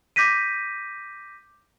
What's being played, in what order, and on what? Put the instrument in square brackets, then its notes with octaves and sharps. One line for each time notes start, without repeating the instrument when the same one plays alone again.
[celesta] D6 G6 A#6 B6 D#7